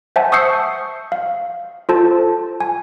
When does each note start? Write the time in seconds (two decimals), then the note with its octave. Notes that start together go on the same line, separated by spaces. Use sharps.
0.16 C5 E5 F#5 G#5 A5
0.32 C#6 D#6 E6 G6 C7 C#7
1.12 F5
1.89 F4 A4 C5 A5
2.60 G#5